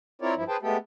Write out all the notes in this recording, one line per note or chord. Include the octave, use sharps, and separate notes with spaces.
C4 E4 F4 A#4 C#5 D5
G2 F3 E4
G#4 B4 C5 G5 A5
G#3 A3 B3 G4 A4